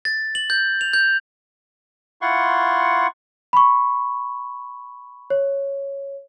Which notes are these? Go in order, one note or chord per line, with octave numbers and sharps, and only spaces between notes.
A6
F#7
G6
F7
G6
E4 F4 F#5 C6 C#6
B5 C#6
C#5